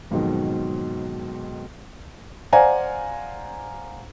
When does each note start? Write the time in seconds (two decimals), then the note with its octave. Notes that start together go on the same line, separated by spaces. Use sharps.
0.10 F2 G#2 B2 D#3 F#3
2.53 C5 D5 F5 F#5 G#5 A#5